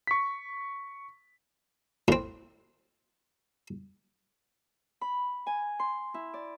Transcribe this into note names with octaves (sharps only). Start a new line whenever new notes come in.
C#6 B6
A2 C4
B5
G#5
C6
E4
D5